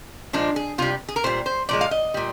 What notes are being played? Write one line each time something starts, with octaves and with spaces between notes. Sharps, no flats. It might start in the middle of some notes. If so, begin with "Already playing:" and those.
A#2 F3 G#3 D4
G#4
C3 G3 F4
G#4
A#4
A#2 G3 C5
C5
A#2 F3 G#3 D5
F5
D#5
A#2 G3